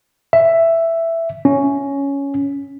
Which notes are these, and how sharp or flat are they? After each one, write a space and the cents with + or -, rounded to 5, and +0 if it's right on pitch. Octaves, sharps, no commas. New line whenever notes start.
E5 +5
C#4 +10